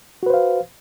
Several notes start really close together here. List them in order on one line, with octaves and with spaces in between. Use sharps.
F#4 B4 C5 F5